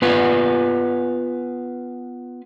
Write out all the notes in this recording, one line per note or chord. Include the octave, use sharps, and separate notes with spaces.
B3 F4 B4 G#5